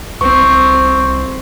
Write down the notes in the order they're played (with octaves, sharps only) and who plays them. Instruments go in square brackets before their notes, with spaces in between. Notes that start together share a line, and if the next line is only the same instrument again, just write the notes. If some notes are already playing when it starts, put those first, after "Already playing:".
[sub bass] C2 [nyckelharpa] C4 [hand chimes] C#6